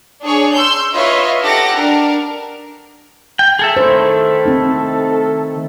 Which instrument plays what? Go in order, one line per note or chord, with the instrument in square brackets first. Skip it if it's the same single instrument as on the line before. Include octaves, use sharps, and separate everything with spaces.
[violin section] D4 G#4 C#5
C6 E6 G6
F4 B4 C#5 D#5 E5
D#4 G4 A4 F#5 D6 A#6
D4 A#4
[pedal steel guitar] G5
G#4 A4 E5
[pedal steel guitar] D#3 A3 E4 [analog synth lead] A4 [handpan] C5
[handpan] C4 D#4